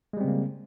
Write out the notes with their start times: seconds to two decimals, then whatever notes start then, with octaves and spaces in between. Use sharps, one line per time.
0.13 G#3
0.17 G3
0.21 C4
0.24 C#3
0.28 A#3